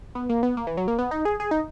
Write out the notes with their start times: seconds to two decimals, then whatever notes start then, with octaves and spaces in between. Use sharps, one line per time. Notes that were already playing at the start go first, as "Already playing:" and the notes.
0.15 B3
0.29 A#3
0.43 B3
0.57 A#3
0.67 E3
0.77 F#3
0.88 A#3
0.99 B3
1.11 D#4
1.25 G#4
1.40 G#4
1.51 D#4